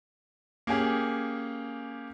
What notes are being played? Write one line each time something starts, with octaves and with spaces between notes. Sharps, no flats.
A#3 C#4 G4 G#4